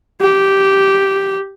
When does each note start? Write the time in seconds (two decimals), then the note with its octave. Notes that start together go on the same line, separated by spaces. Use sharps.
0.22 G4